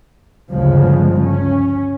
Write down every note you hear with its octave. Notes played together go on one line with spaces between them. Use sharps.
G1 D2 C#3 F3 G#3
C#4